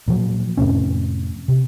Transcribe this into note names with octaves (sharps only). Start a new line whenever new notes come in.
A#2 F3 F#3
F2 A2 C3 C#4
C3